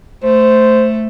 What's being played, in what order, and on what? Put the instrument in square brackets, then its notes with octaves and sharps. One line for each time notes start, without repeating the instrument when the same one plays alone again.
[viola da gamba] A3 [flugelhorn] C5